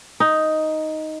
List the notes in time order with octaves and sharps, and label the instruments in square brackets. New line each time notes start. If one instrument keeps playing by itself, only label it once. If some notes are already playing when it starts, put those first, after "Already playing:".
[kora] D#4